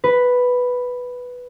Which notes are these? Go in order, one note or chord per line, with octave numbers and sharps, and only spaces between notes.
B4